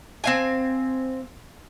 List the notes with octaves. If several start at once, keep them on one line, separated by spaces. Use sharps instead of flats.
C4 F5 G#5